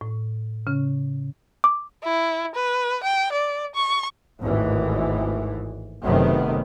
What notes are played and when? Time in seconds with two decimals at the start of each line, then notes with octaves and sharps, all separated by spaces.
0.01 A2
0.67 C#3 C#4
1.64 D6
2.04 E4
2.55 B4
3.03 G5
3.32 D5
3.75 C#6
4.40 G#1 D#2 A2 E3
6.02 F#1 F#2 C3 D#3 A3 B3